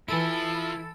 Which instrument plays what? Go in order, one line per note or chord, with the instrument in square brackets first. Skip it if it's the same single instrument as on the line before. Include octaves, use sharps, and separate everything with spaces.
[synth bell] E3 B5 D7 [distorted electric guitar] F3 [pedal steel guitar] E4 [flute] A4